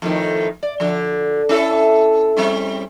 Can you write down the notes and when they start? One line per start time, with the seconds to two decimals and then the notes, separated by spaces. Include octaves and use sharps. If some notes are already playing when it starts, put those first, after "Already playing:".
0.02 F2 A2 D#3
0.63 D5
0.80 D3 F3
1.49 C#4 E4 A4
2.37 G3 C4 C#4